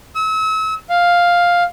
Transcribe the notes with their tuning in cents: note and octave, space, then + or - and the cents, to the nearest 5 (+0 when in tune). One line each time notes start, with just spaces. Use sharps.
E6 -35
F5 +5